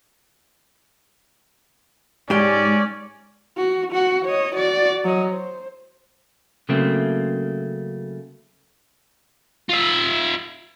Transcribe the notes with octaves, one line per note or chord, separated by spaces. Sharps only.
G#2 G#3 C#4 G4 D5
F#4
F#4 F#5
C#5 D#5
F#4 D5
F#3 D#5
C5
C#3 F#3 A3 A#3 C4
F4 E5